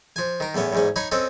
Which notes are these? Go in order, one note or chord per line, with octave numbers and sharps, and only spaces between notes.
F3 G#5
D#3 A#4
E2 A2 B3 C#4
E2 G#2 C#4
D#4 C#5 G#5 B5
C4 C#4 A4 D#5